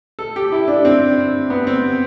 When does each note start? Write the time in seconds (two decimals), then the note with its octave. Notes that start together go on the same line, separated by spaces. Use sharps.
0.19 A4
0.36 G4
0.52 E4
0.68 D4
0.85 C4
1.50 B3
1.67 C4